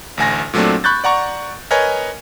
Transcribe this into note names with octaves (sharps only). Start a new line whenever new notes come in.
A1 D2 G#5 A#6
A#2 F#3 A3 C4 D4
B5 C#6 F#6 G6 A6
D5 F#5 A#5 C#6
A#4 B4 C#5 D#5 G#5